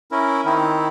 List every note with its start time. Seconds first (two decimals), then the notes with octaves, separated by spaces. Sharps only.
0.12 C#4 E4 A#4
0.45 D#3 C4 D#4 E4